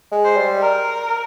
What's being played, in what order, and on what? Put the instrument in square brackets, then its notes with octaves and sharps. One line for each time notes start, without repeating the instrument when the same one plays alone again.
[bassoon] G#3
[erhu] C5
[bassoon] G3
[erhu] A#4